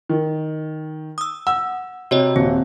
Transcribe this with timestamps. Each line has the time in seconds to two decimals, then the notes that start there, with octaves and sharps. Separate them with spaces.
0.09 D#3
1.18 D#6 E6
1.47 F#5 E6
2.11 C3 F#4 C#5 D#5
2.36 D#1 C4